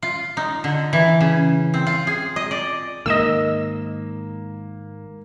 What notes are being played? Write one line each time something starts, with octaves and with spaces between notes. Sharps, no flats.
F4
D#4
D3
E3
C#3
C4
F4
G#4
D#5
D5
G#2 D#3 A#3 D#5 E6 E7